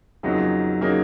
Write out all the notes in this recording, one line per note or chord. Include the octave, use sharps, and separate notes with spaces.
F2 C#3 F#3 A#3 D#4
C#3 F#3 A#3 D#4